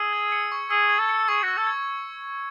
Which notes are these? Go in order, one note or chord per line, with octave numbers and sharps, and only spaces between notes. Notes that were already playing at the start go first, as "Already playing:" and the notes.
Already playing: G#4 E6
G#6
C#7
C#6
G#4 E6
G#6
A4
C#7
G#4 C#6
F#4 E6
A4
G#6